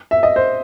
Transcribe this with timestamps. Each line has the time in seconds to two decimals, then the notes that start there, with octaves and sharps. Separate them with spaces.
0.11 E5
0.23 D#5
0.36 C5